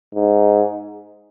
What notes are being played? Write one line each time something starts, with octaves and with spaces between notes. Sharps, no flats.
G#2